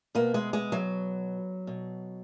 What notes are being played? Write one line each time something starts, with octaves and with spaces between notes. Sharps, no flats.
B2 A#3
G#3
G#3
F#3
B2